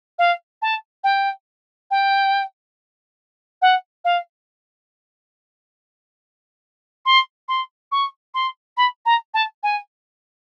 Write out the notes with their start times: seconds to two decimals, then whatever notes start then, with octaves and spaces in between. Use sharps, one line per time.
0.18 F5
0.61 A5
1.03 G5
1.90 G5
3.61 F#5
4.04 F5
7.05 C6
7.48 C6
7.91 C#6
8.34 C6
8.77 B5
9.05 A#5
9.33 A5
9.63 G#5